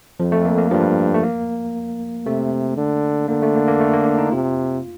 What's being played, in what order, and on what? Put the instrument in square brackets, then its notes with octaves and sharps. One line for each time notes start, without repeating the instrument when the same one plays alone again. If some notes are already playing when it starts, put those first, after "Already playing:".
[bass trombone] F2 [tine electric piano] F3
[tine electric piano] A3
A#3
A#3
[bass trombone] G2 [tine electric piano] F3
[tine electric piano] A3
A#3
[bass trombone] C3 [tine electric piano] A3
[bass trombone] D3
[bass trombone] D3 [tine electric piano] A#3
[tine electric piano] A3
A#3
A#3
A3
A#3
D4
D#4
[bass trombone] C3 [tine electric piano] F4